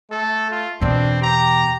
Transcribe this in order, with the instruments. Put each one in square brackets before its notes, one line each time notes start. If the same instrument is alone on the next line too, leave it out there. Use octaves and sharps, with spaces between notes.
[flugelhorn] A3 [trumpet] A4
[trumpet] F4
[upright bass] E2 B2 [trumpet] C4 [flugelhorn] D4
[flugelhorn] G4 [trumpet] A#5